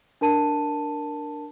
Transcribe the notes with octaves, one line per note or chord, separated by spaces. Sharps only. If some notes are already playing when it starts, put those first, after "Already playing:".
D4 A#4 A5 D#7